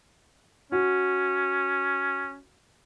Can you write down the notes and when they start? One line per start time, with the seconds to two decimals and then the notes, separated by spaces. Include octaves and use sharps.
0.72 C#4 F#4